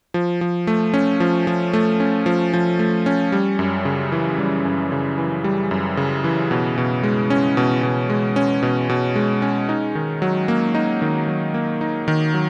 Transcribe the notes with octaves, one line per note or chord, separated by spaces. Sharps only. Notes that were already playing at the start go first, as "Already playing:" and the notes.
F3
F3
A3
C#4
F3
F3
A3
C#4
F3
F3
A3
C#4
G3
F#2
C#3
E3
G3
F#2
C#3
E3
G3
F#2
C#3
E3
B2
B2
G#3
C#4
B2
B2
G#3
C#4
B2
B2
G#3
C#4
D#4
D#3
F#3
A#3
D#4
D#3
F#3
A#3
D#4
D#3
F#3